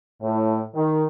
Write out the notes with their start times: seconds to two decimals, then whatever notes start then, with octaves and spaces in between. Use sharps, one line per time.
0.22 A2
0.75 D#3